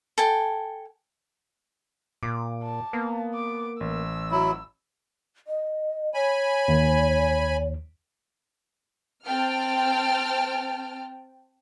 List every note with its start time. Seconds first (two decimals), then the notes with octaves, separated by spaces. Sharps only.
0.18 A4 G5 G#5
2.23 A#2 D6
2.63 A5
2.93 A#3 B3
3.34 D6
3.81 A1 E6
4.32 F#3 E4
5.47 D#5
6.14 C#5 G#5 B5
6.68 D#2
9.27 C4 G5 A5 F6